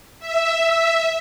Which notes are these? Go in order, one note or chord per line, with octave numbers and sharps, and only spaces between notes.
E5